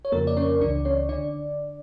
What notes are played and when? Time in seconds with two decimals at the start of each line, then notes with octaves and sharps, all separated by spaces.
0.05 C#5
0.12 F2 C#3 F3 A#3 A#4
0.27 D5
0.37 C#4 C#5
0.61 C#2 C#3 E3 D4 D5
0.85 C#4 C#5
1.09 D3 D4 D5